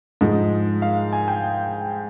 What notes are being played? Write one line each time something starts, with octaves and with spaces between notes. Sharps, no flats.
G#2 F3 G#3 D#5
F5
G#5
G5